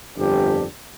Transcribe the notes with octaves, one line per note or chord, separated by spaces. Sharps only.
G1 F2 D4 G4